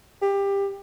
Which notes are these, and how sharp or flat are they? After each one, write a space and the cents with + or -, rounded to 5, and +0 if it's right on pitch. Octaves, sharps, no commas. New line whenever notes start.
G4 +20